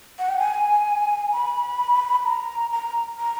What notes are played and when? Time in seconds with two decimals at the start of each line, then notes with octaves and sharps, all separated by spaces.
0.19 F#5
0.29 G5
0.38 G#5
1.32 B5
2.25 A#5
2.72 A#5
3.19 A#5